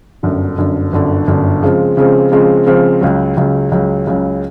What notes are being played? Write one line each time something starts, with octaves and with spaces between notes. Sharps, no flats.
G1 F#2 D3
G1 F#2 D3
G1 F#2 D3
G1 F#2 D3
C#3 F3 G#3 C4
C#3 F3 G#3 C4
C#3 F3 G#3 C4
C#3 F3 G#3 C4
C#2 C#3 F#3
C#2 C#3 F#3
C#2 C#3 F#3
C#2 C#3 F#3